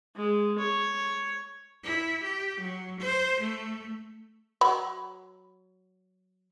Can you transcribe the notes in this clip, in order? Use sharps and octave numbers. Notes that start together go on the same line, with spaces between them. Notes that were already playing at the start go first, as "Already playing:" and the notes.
G#3
C#5
E4
G4
F#3
C5
A3
F#3 B5